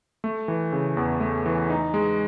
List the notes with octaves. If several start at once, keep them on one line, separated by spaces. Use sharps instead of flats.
A3
E3
C#3
E2
A3
E3
D#4
G#3